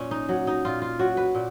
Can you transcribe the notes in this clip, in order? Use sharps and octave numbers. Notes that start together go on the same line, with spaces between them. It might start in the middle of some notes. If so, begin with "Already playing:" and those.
Already playing: A#2 C#4
D#4
F#3
D#4
A#2 F4
F4
F#3 F#4
B4
A#2